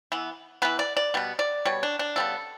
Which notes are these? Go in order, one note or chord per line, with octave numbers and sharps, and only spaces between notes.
E3 B3
E3 B3 B4
D5
D5
B2 G3 B3
D5
B2 G3 C#5
D4
D4
C#3 G3 B3 A4